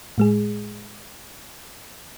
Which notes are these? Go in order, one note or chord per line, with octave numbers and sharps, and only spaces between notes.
A2 G#3 G#4